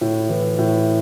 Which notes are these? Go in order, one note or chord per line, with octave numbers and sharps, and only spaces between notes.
A2
E3
A2